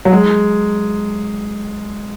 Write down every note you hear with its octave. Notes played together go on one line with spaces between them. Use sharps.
F#3
G#3